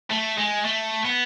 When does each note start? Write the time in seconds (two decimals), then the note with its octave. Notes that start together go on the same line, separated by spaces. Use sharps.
0.10 A3
0.38 G#3
0.65 A3
1.05 B3